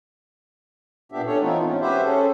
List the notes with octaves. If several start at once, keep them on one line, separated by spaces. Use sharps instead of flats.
A#2 B3 D4 G4 E5
C#4 D4 A4 C#5
E3 A3 B3 C4 D#4 F4
G#2 C#4
F#4 G4 B4 C5 E5
C#4 G#4 A4